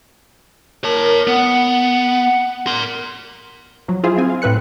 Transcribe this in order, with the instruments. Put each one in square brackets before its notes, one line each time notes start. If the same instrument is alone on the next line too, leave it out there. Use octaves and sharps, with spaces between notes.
[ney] A#4 [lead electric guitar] C#5 A5
[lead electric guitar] B3 [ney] F#5
[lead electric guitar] A#4 C6
[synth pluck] F3 F#3
E4 F4 G#4 C5 E5 F5
C4 G#5
F5
A2 C4 B4 F#6 C#7